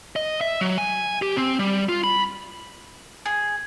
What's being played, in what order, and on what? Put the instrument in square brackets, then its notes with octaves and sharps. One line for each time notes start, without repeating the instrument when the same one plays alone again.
[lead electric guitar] D#5
E5
F#3
G#5
G4
C4
G3
F4
B5
[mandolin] G#4